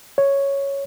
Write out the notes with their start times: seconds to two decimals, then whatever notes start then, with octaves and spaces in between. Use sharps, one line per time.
0.18 C#5